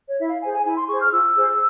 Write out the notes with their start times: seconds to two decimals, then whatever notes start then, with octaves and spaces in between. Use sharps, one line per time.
0.08 C#5
0.18 E4 E5
0.30 F5
0.42 G#4 C5 G#5
0.54 G#5
0.65 E4 G#5
0.77 C6
0.88 G#4 C#6
0.92 C5
1.00 F6
1.11 F4 E6
1.35 G#4 C5